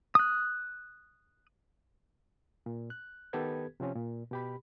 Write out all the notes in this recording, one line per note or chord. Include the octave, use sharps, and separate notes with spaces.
D#6 F#6
A#2
F#6
D#3 B3 G4 A4 B4 G#6
C3 F3 C4 C#4
A#2
B2 G4 B5